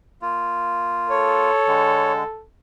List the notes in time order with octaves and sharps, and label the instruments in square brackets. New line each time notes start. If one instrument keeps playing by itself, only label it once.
[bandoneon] A#3 F4
[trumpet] A4 [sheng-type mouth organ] C#5
[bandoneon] D3 G#3